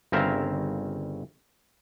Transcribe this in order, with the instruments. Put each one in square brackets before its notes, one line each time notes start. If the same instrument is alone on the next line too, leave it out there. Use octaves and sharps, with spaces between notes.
[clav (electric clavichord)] G1 C#3 C4 A#4 E5 F5